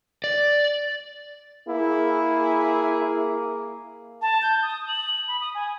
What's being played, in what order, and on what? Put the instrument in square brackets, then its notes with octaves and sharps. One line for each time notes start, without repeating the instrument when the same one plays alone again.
[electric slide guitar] D5
[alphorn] A#3 [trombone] E4 [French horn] G#4
[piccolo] A5
G6
D#6
F#7
B5
D#6
G#5